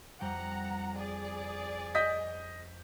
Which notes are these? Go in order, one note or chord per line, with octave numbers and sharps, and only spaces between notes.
F2 G3 F#5 G5 A#5
G#4 D5
D#5 G6 B6